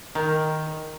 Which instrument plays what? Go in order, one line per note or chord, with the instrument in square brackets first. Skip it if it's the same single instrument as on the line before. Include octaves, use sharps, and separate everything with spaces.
[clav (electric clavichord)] D#3 [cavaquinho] A#4